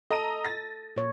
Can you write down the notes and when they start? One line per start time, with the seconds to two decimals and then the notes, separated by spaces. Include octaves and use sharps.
0.11 A4 D#5 A#5 D#7
0.45 A6 A#6
0.97 A#2 C#5